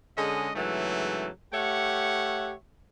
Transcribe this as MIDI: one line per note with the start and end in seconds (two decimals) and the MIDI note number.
0.17 0.50 50
0.17 0.50 56
0.17 0.50 61
0.17 0.50 68
0.17 0.50 75
0.55 1.29 44
0.55 1.29 49
0.55 1.29 52
0.55 1.29 54
0.55 1.29 57
1.53 2.52 57
1.53 2.52 67
1.53 2.52 73
1.53 2.52 76
1.53 2.52 78